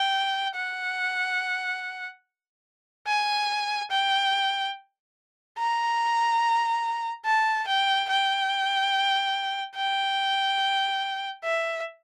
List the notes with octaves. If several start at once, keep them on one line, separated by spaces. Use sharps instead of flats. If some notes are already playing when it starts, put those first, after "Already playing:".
Already playing: G5
F#5
G#5
G5
A#5
A5
G5
G5
G5
E5